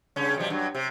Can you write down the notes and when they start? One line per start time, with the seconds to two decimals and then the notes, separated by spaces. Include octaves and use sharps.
0.16 G2 C#3 C#4
0.38 B2 F3 G3
0.50 G2 F#3
0.75 C3